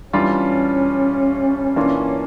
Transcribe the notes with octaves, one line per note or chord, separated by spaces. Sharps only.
E3 G3 C#4 D4 F4
E3 A#3 C#4 D4 F4